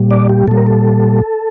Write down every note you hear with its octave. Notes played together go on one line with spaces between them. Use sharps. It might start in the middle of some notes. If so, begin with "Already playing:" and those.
Already playing: A#2 G3
D5
G4
A#2 G3 A4
A#4
A4